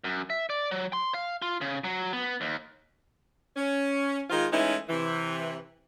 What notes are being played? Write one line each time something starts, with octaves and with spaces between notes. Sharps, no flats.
F#2
E5
D5
F#3
C6
F5
F4
C#3
F#3
B3
D#2
C#4
D#3 G#3 F4
E3 G#3 A3 C#4 D#4 E4
C3 E3